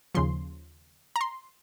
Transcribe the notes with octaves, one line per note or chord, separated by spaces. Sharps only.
D#2 C#3 F3 C6
A#5
C6